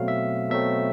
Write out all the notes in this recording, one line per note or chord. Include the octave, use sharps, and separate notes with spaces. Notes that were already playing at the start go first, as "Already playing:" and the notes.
Already playing: B2 F#3 A3 C4 F5
E5
B2 F#3 A3 C4 E5